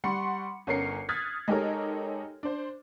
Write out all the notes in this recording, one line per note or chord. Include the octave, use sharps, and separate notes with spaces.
G3 F#5 C6 C#6 C#7
G1 C#4 A#4 C7 C#7
D#6 F6 F#6 G#6 A6 B6
G#3 D#4 G4 A4 A#4 C#5
D4 C5